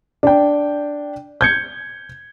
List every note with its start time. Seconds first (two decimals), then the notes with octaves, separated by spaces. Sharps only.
0.23 D4 G5
1.41 G6 G#6 C#7